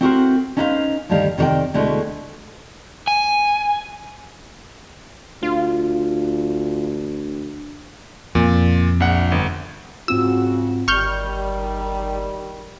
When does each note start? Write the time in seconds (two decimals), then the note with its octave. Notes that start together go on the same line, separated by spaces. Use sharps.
0.01 C4 E4 F#4 G#4 A#4 C5
0.57 C#4 D#4 E4 B4 C5 F5
1.09 D2 G2 D#3 G3 F5
1.38 C3 D#3 C#5 D5 G5
1.74 D2 B2 G#3 A3 E4
3.07 G#5
5.43 D2 F4
8.35 F2 A#2
9.00 A#1 F#5
9.32 G1
10.08 G#2 C#3 C4 F4 F#4 E6
10.88 G1 D#3 G3 C#6 F6 G6